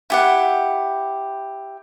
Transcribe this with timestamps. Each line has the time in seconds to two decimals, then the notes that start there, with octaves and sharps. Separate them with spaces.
0.10 E4 G4 F#5